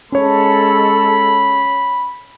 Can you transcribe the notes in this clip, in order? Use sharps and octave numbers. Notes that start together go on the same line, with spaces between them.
G#3 C#4 A4 C#5 B5